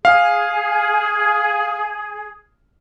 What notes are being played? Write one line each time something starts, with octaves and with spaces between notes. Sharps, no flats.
G#4 F5